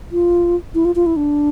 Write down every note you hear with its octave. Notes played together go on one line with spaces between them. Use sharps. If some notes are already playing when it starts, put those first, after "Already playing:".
F4
E4
F4
F4
E4
D4